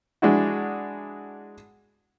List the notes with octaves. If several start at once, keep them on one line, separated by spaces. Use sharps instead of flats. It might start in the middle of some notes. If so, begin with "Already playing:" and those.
G#3 D4 E4 F#4